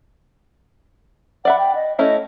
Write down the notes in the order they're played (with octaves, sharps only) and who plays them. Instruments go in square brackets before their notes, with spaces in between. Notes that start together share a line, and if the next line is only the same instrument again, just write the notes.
[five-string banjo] D5 E5 B5 [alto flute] F#5
[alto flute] G5
D#5
[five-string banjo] A3 C#4 E4 [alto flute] D#5